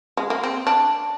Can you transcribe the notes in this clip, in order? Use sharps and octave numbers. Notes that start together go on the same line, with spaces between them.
G#3
A#3
C4
D4